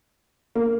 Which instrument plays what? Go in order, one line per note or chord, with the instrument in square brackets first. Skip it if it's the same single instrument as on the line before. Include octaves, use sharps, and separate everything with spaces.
[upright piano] A#3